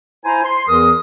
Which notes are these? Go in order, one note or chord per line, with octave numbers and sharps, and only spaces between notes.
E4 C5 G#5 A#5
C6
E2 E3 A#4 D#6